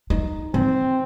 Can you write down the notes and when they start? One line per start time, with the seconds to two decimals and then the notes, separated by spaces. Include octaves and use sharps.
0.10 D#4
0.54 E3 C4